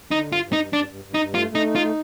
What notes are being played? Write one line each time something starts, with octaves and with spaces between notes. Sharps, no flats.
D3 D#4
G2
F4
G2
D#4
G2
G2 D4
G2
G2
D#4
G2
A3 F4
A3 D#4
D#4
F4
A3